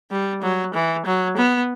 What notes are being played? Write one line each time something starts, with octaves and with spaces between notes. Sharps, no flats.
G3
F#3
E3
F#3
B3